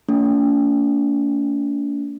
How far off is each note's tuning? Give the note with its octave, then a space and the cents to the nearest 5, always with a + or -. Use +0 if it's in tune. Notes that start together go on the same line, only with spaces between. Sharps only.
A3 +40 C#4 +45